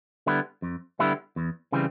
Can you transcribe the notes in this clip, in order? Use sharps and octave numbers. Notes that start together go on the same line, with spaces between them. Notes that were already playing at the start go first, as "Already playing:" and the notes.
D3 G3 B3 E4
F2
D3 G3 B3 E4
E2
C#3 E3 G3 C4